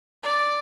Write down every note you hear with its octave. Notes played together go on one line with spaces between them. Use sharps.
D5